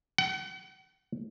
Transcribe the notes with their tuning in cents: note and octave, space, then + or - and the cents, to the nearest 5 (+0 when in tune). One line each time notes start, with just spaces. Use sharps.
F#5 +45